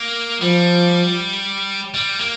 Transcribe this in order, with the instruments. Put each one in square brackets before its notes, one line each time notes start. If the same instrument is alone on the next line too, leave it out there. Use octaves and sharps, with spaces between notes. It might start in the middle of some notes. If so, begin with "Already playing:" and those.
Already playing: [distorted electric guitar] A#3
[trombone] F3 [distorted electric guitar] G3
[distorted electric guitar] G3
A#3